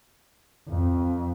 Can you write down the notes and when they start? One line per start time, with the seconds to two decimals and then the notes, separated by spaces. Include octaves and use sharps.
0.69 F2